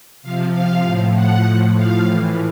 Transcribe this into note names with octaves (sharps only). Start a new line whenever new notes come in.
C3 F3 F5
F5
A2 F3
F#5
A2 F3
F5
A2 E3